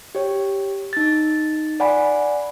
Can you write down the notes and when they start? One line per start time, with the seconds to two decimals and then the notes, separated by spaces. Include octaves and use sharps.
0.15 G4 C#5
0.93 D#4 A6
1.80 D5 F#5 G#5 B5